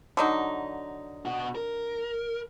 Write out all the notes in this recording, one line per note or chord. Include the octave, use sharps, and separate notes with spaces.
D3 F#3 D#4
B2 F#4
A#4